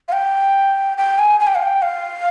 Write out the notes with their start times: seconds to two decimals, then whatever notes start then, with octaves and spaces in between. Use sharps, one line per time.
0.08 F5
0.13 G5
0.98 G5
1.19 G#5
1.40 G#5
1.47 G5
1.55 F5
1.62 G5
1.82 F5